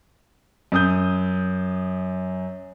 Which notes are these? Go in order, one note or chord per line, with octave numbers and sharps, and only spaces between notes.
F#2 D#6 G6